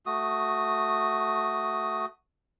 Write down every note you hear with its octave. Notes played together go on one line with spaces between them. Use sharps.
A3 F#4 D#6